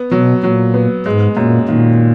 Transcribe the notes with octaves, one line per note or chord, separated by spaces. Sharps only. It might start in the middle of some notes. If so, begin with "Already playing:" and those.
Already playing: B3
B2 F#3
A#2 F#3
B3
G#2 G#3
F#2 A#2
A#2 D#3